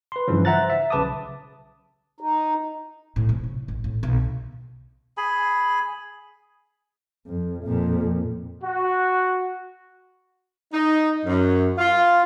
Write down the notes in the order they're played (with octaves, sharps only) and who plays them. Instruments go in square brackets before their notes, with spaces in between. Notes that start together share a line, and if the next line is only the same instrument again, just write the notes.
[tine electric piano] B4 C6
G2 C#3 E3 F3
C5 E5 F#5 A#5 F#6 A6
E5
B1 C#3 B4 A5 D6 D#6
[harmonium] D#4
[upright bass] A2
C3
F#3
A1
A2
B1
[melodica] G#4 G#5 B5
[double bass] F2
F2 A#2
[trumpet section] F#4
[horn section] D#4
F#2
F4